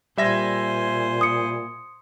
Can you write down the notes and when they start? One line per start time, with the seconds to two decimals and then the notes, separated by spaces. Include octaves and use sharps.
0.17 A#2 G3 C5 E5 G#5 A#6
1.21 D#6 C#7